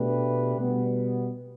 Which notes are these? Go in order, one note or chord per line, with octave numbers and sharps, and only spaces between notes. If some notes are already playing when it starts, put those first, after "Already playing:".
Already playing: B2 A3 D4 G4 B4
B2 G3 B3